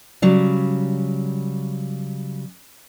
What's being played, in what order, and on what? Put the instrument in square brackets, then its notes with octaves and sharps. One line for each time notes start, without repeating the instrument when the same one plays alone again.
[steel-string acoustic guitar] C#3 F#3 G3